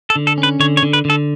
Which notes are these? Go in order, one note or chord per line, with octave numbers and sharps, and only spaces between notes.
A4
D3
A4
C#4
B4
D3 C#5
C#5
D3
B4
D3 A4